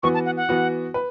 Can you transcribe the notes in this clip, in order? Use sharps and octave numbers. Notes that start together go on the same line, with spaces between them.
E3 B3 F#4 C#6
A5
F#5
F#5
E3 B3 F#4
B4